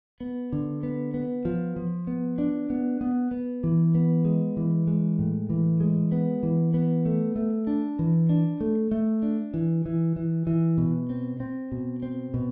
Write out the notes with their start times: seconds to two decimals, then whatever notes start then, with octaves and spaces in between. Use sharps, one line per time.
0.20 B3
0.53 D3
0.83 B3
1.14 B3
1.45 F3
1.76 F3
2.07 B3
2.38 D4
2.70 B3
3.01 B3
3.31 B3
3.64 E3
3.95 B3
4.25 G#3
4.57 E3
4.87 G#3
5.19 A2
5.50 E3
5.80 G#3
6.12 B3
6.43 E3
6.74 B3
7.06 A3
7.36 A3
7.67 D4
7.99 E3
8.29 D4
8.61 A3
8.91 A3
9.22 D4
9.54 E3
9.86 E3
10.16 E3
10.47 E3
10.78 B2
11.10 C4
11.40 C4
11.72 B2
12.03 C4
12.34 B2